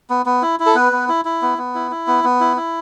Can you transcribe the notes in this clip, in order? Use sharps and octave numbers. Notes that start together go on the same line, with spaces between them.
B3
B3
E4
E4
A4
B3 B4
B3
E4
E4
B3
B3
E4
E4
B3
B3
E4
E4